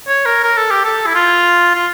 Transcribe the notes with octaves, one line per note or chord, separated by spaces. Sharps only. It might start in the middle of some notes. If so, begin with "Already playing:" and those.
C#5
A#4
A#4
A4
G4
A4
E4
F4
F4